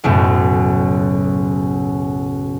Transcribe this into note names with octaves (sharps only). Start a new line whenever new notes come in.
F#1 B1 F#2 A2